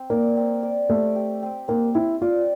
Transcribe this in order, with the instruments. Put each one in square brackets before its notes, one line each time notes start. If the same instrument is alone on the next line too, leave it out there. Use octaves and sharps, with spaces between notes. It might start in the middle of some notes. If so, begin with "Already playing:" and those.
Already playing: [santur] C4
[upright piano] A#3 [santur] D5
[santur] C4
D5
[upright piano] A3 [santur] G4
[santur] G4
C4
[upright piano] A#3 [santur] C4
[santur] C4 [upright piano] E4
[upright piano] F4 [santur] D5